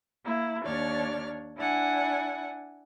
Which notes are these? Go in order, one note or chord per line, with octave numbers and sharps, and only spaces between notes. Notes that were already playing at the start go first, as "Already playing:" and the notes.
A#3 E4
D#2 D4 C#5 D5 F6
D4 E4 F#5 G#5